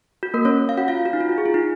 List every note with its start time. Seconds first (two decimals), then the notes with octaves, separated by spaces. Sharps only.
0.23 F#4
0.34 A#3 A#4
0.45 C#4 C#5
0.69 F5
0.77 F#4 F#5
0.88 F4 F5
1.05 F#4
1.13 D#4
1.21 F4
1.29 F#4
1.38 G#4
1.46 F4
1.54 D#4